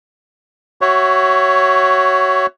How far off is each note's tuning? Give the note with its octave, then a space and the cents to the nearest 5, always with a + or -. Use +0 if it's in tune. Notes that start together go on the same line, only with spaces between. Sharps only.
F#4 +20 C#5 +0 E5 +15